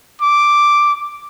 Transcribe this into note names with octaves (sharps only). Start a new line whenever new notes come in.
D6